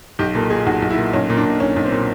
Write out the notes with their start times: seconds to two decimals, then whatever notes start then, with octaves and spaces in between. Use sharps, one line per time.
0.19 B1 G4
0.35 A#2 A4
0.50 A#2 G#4
0.66 B1 F#4
0.82 B1
0.90 E4
0.98 A#2
1.13 B1 C#4
1.30 A#2
1.37 D4
1.45 A#2
1.60 B1 C#4
1.76 B1
1.84 C4
1.92 A#2